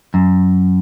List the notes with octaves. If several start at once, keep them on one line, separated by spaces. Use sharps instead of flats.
F#2